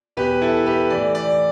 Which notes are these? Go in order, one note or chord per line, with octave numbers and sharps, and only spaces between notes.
E2 B2 G4 B4
E4 A4
G4 B4
A2 E3 D5
D5